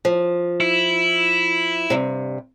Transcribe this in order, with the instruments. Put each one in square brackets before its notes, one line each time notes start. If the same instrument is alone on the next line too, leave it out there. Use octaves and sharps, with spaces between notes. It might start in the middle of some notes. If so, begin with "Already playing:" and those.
[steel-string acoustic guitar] F3
[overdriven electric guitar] E4
[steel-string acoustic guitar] G2 C3